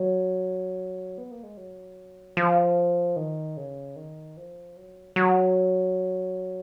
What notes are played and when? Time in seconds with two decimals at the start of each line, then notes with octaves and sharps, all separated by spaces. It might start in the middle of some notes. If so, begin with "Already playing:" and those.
Already playing: F#3
1.18 B3
1.31 A#3
1.43 G#3
1.57 F#3
2.37 F3
3.16 D#3
3.57 C#3
3.96 D#3
4.37 F3
4.77 F#3
5.16 F#3